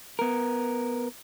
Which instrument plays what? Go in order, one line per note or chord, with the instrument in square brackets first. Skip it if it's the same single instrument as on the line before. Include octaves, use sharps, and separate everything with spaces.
[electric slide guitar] B3 A#4